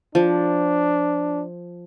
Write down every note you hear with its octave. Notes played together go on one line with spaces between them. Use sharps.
F3 D4